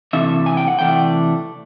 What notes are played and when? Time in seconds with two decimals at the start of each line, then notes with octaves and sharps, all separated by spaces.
0.13 C3 E3 A3 D4 E5
0.46 G#5
0.57 G5
0.68 F#5
0.79 C3 E3 A3 D4 G5